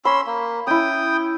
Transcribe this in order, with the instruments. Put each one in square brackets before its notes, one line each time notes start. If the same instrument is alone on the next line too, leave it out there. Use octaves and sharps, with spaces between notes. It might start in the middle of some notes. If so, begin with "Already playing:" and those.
[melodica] C#4 C6 E6 [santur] B5
[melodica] A#3
[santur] C#4 E4 [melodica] G5 D#6